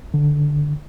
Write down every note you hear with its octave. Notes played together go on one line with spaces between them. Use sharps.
D3